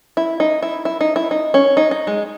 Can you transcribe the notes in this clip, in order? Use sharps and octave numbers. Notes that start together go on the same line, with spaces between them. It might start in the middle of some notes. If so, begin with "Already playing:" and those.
E4
D#4
E4
E4
D#4
E4
D#4
C#4
D#4
D#4
G#3